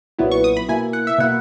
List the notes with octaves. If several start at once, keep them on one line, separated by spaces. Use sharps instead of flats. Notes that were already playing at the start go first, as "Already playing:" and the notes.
B1 A#2 F#3 B3 E4
C#6
D#6
B5
B2 A#3 E4 G#5
F#5
E5
B2 A#3 E4 F#5